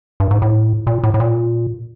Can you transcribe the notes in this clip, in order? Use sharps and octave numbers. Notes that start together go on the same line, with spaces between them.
G2
G#2
A2
A#2
A2
A2
A#2